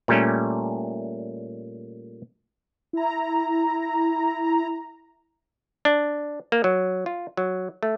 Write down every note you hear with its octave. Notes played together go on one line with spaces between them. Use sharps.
A#2 G3 A3 C#4
E4 A#5
D4
A#3
F#3
F4
F#3
A3